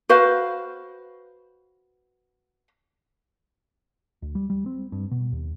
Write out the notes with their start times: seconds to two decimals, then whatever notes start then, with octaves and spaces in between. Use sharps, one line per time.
0.09 F#4 B4 C5 F5
4.22 D2
4.35 G3
4.50 G3
4.66 C4
4.92 G2
5.11 B2
5.32 D#2